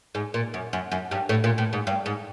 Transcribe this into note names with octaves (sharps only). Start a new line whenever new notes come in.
G#2
A#2
F#2
F#2
F#2
G2
A2
A#2
A2
G#2
G2
G#2